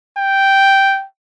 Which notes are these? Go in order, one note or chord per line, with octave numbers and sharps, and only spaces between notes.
G5